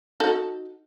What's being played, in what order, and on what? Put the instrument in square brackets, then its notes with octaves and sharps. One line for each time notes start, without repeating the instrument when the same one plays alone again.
[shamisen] D#4 F#4 A4